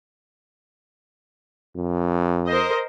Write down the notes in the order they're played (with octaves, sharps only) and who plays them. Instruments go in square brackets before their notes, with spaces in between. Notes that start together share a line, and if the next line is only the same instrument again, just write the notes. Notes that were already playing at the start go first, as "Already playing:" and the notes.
[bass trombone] F2
[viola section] A#4 C5 D#5